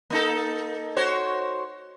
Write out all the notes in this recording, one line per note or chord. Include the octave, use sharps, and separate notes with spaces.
A#3 D#4 A4
F#4 C5 C#5